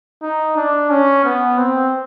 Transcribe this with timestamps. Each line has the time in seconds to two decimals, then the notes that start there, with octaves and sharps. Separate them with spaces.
0.22 D#4
0.56 D4
0.90 C#4
1.24 B3
1.58 C4